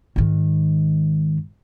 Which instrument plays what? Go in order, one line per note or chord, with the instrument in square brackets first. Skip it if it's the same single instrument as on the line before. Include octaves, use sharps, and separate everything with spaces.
[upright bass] G#2 D#3